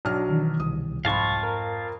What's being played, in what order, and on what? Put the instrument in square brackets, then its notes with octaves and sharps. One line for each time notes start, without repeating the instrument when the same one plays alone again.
[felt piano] B1 F#3 F6 [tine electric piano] D4
[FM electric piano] B2 D#3 E3
[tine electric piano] C2 [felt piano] D#6
[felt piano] F2 F4 B5 [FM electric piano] G#2 [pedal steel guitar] F5 A5 C#6
[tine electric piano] A#4